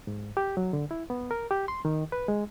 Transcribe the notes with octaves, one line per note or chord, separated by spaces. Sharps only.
G#2
G4
F#3
D3
E4
B3
A#4
G4
C6
D#3
B4
G#3